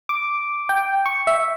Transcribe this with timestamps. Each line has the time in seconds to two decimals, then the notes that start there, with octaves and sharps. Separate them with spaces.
0.09 D6
0.69 G5
1.06 C#6
1.27 E5